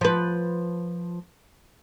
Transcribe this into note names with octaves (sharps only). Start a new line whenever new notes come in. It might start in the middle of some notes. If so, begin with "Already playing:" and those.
F3 B4